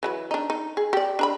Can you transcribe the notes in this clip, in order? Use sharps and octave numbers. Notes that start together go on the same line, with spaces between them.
E3 F#3 B4
D4 D#4
D#4
G#4
G4 D5
D4 A#5 B5